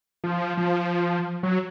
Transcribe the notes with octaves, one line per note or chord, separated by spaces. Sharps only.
F3
F3
F#3